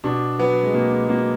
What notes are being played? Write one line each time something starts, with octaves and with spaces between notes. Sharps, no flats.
B2 D4
F#3 B3
G#3
B2 A#3
G#3
F#3 A#3